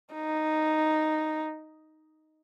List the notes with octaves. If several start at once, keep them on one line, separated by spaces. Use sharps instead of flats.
D#4